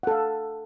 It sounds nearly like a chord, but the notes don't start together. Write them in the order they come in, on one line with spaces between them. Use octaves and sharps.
F#5 A4 F5